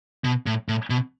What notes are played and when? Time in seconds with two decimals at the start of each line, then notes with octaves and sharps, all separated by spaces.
0.24 B2
0.46 A2
0.68 A2
0.90 B2